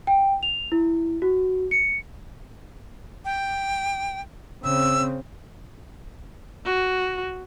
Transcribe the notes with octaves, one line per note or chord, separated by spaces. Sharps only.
G5
F7
E4
F#4
C#7
G5
C#3 C4 E6
F#4